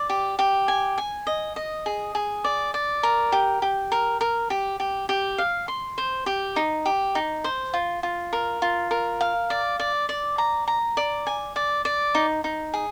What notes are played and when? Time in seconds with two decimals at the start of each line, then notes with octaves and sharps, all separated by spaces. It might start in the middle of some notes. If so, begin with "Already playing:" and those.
Already playing: D5
0.09 G4
0.39 G4
0.68 G#5
0.98 G#5
1.27 D#5
1.56 D#5
1.86 G#4
2.15 G#4
2.44 D5
2.74 D5
3.03 A#4
3.32 G4
3.62 G4
3.92 A#4
4.21 A#4
4.50 G4
4.80 G4
5.09 G4
5.38 F5
5.68 C6
5.98 C5
6.26 G4
6.56 D#4
6.85 G4
7.15 D#4
7.44 C5
7.74 F4
8.03 F4
8.33 A#4
8.62 F4
8.91 A#4
9.21 F5
9.50 D5
9.80 D5
10.09 D5
10.38 A#5
10.68 A#5
10.97 D5
11.27 G#5
11.56 D5
11.85 D5
12.15 D#4
12.44 D#4
12.74 G#4